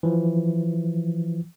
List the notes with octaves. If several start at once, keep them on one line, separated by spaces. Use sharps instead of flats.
E3 F3